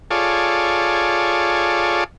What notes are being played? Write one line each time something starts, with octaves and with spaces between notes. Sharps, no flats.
F4 G#4 A4 C#5 D5